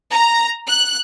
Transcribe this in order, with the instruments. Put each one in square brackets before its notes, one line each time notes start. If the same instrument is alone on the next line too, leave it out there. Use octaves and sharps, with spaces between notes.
[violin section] A#5
F#6